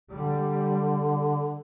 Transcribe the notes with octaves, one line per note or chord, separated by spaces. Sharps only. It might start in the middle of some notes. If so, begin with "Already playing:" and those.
D3 G3